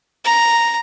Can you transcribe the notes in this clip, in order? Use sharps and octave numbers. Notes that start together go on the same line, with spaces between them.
A#5